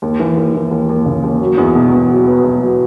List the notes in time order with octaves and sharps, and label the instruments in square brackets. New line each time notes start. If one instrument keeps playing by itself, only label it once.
[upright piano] D#2
E3
D#2
E3
D#2
D#2
C#3
D#2
F#3
E2
B2
E2
F#3
B3
B2
F#3